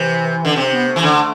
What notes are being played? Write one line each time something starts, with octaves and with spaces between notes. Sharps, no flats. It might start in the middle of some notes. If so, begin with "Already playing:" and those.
Already playing: C3 E3
D3
C3 C4
B3
A3
E3
D3